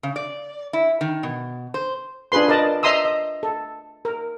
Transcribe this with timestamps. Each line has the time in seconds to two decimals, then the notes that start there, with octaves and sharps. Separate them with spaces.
0.03 C#3
0.16 D5
0.73 E4
1.01 D#3
1.23 B2
1.74 C5
2.32 D4 F4 G#4 B4 C6
2.48 A#4 D5 D#5 A5
2.83 D#5 E5 A#5 C6 D#6 E6
3.05 D#5
3.43 A4
4.05 A#4